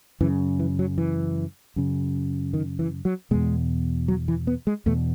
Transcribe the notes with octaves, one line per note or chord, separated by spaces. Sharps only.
F#2 C#3 E3
E3
F#3
E3
F#2 C#3
D#3
E3
F#3
E2 B2 G#3
F#3
E3
B3
G#3
E2 B2 A3